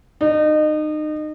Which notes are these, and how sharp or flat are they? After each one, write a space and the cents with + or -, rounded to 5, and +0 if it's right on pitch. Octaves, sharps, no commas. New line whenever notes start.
D#4 -30